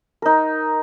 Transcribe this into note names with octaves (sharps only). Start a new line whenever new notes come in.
D#4 A#4